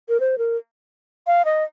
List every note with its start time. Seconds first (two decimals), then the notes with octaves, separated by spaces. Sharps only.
0.09 A#4
0.20 C5
0.38 A#4
1.27 F5
1.45 D#5